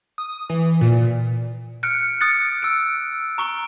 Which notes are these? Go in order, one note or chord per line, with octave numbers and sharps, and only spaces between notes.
D#6
E3
A#2
F6 F#6 C#7 D7
D#6 F#6 A6 C#7 D7
E6 D7
A#5 C#6 D7 G7